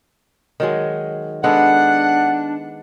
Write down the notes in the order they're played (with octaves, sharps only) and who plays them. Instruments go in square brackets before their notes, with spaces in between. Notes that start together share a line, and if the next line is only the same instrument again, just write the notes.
[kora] D#3 F#3 G#3
[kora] G#3 B3 A4 [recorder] D4 [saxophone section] F#5